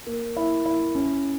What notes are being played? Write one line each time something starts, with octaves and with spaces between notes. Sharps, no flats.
A#3
E4
E4
C#4